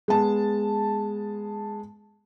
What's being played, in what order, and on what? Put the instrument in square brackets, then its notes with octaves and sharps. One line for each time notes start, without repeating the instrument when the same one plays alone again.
[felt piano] G#3 B3 A5